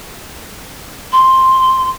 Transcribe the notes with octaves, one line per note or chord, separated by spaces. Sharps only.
C6